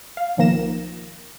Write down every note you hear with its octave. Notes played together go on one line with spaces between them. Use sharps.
F5
B1 D#3 F3 A#3 A#6 E7